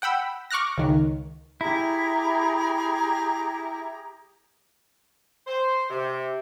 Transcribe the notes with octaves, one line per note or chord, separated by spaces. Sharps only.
F#5 G5 B5 E6
C#6 D6 F6 F#6 A#6
C#2 D#3
E4 G4 G#4 A#5
C5
C3